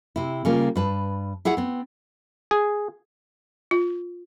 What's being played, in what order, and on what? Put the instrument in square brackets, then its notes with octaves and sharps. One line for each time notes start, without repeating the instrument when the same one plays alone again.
[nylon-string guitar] C3 E4
C#3 G3 A#3 F4
G2 B4 A5
E4 G#4 C#5 F#5
B3 C4
[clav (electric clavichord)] G#4
[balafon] F4